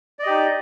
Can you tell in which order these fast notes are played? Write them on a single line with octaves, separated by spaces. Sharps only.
D5 D#5 G4 D#4